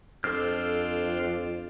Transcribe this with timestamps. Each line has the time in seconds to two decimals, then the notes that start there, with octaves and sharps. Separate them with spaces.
0.24 F2 D4 F4 A4 C5 F6